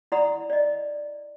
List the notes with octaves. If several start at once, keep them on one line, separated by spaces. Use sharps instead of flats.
E4 D5 F#5 A#5 B5 D#6
D5 D#5